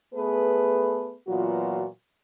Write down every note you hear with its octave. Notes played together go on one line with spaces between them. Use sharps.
A3 B3 G#4 A4 B4
A#2 E3 F#3 B3 F4 F#4